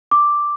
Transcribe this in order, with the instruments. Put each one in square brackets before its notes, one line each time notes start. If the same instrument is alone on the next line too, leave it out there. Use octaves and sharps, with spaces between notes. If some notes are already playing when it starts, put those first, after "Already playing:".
[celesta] D6